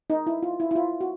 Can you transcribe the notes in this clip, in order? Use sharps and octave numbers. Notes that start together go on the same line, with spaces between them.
D#4
E4
F4
E4
E4
F4
F#4